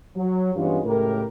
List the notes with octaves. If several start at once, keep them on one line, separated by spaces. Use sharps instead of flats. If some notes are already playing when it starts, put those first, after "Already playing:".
F#3
G2 E3 G#3 B3 C#4 F4
C#2 A2 G4 A#4